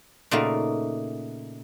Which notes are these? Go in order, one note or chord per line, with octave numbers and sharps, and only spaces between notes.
A#2 C#3 A3 D#4 F#4 A#4